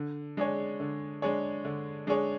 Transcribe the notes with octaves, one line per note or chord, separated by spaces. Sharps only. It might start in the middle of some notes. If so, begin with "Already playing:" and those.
Already playing: D3
G#3 D4 G#4 C#5
D3
G#3 D4 G#4 C#5
D3
G#3 D4 G#4 C#5